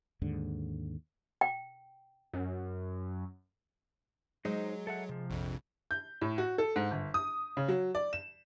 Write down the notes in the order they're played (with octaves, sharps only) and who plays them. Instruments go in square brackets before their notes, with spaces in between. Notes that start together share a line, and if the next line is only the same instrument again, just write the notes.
[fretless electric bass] D#2 G#2 D3
[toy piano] G5
[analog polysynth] F#2
[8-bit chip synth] F#3 [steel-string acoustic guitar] G#3 [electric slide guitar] D#4 C5 D#5
[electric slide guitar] A4 E5 F#5
C3 F3
[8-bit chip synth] A#1 F2
[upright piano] G6
A2
F#4
A4
G#2
G1
D#6
C#3
F#3
D5
E7